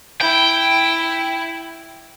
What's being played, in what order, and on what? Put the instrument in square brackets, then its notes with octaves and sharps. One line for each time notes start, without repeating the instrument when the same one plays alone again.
[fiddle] E4 [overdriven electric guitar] G5